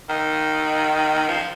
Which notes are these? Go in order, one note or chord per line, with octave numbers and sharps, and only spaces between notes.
D#3
F3